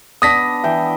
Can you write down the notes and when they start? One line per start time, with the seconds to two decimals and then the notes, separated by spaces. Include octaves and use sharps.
0.22 B3 D4 D#6 A#6 B6
0.64 E3 E5 G5